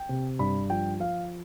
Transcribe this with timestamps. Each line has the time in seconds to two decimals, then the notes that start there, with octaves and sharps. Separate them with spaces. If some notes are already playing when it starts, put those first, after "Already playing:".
Already playing: G5
0.09 C3
0.39 G2 B5
0.70 F3 G5
1.00 F3 F5